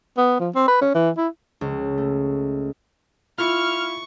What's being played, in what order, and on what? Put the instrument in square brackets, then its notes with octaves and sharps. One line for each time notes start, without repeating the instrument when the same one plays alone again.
[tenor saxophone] B3
F3
C4
B4
C#4
E3
E4
[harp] C#2
A3
[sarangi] E4 [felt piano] F4 [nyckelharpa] C#6 [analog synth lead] F6